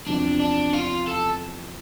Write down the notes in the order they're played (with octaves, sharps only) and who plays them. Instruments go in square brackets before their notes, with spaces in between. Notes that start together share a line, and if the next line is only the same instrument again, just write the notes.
[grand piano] E2 C3 F3 [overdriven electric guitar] D4
[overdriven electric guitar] D4
F4
A4